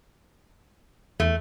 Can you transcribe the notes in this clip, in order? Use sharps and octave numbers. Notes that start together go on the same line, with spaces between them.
E2 A3